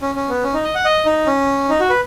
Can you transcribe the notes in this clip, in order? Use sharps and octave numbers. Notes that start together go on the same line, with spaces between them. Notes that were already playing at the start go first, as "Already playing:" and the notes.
C#4
C#4
B3
C#4
D#4
D#5
F#5
D#5
D#4
C#4
D#4
F#4
B4